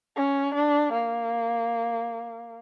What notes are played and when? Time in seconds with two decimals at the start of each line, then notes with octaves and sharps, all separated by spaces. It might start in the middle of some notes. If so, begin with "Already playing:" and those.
0.16 C#4
0.55 D4
0.93 A#3